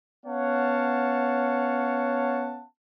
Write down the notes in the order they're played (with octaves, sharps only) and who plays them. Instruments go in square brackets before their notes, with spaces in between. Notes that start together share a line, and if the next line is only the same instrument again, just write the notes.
[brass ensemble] B3 C#4 C#5 F5 F#5 A5